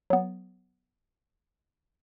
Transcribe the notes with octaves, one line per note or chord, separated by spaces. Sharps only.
F#3 B3